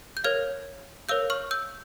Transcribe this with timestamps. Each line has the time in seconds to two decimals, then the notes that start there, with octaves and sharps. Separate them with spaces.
0.17 G6
0.24 A#4 C#5 F5 F6 G#6
1.09 A#4 C#5 F5 E6 G6
1.30 C#6 F6
1.51 E6 G6